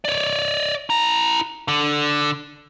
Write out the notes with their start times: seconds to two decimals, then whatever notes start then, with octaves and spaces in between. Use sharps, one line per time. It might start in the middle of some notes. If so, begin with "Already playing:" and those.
0.05 C#5 D5
0.90 E4 A#5
1.68 D3